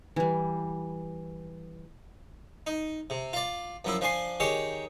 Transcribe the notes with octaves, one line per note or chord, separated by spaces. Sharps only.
E3 G3
D#4
C3
F4 D5
F#2 F3 E4
F3 D4 G#5 C6
D#3 G4 G#4 C#5 C#6